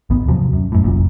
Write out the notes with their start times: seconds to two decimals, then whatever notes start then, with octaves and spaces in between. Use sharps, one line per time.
0.10 G#1 D#2 D#3 B3
0.28 D#2 C3 F3 F#3
0.53 F#2
0.72 F#2 A2
0.84 F1 A#1 F#2 A#2